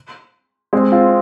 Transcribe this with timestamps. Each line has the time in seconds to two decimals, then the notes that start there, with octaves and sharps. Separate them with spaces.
0.73 G#3 C4
0.92 C4 F4